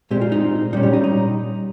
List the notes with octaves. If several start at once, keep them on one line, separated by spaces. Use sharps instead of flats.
A#2 G#3 C4 G4
F4
D#4
A#2 G3 C#4 D#4
G4
D#4
D#4